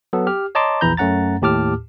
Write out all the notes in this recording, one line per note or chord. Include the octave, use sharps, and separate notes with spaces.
F#3 B3 A4
G4 F6
C#5 D#5 A5 A#5 C6 D6
A#1 E2 E3 A#5 B5 G6
F#2 A3 C#4 F#5 A#5 A6
D#2 A2 G4 A5 D6 F6